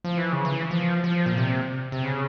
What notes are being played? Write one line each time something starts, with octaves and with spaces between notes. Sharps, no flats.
F3
E3
C#3
E3
F3
F3
A#2
C3
C3
C#3